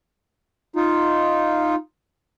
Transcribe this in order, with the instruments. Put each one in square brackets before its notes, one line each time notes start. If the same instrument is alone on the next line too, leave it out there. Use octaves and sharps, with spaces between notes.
[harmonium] D#4 F4